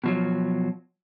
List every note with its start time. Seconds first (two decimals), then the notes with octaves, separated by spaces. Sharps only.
0.04 B2 F3 F#3